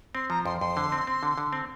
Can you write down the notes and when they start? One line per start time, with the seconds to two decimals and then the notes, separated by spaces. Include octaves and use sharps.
0.15 C4 C6
0.30 F3 A#5
0.46 F2 C6
0.61 F2 C6
0.77 D3
0.92 C4
1.07 C4
1.23 D3
1.38 D3
1.53 C4